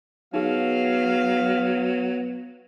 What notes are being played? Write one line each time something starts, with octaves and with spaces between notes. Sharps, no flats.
F#3 B3 D#4 G#4 F5